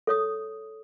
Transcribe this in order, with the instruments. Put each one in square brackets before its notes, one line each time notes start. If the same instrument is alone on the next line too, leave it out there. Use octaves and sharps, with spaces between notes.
[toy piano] A4 C#5 D#6